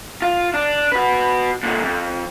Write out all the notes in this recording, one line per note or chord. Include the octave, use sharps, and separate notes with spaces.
F4
D4
F#4 B4
A#2 D3
F2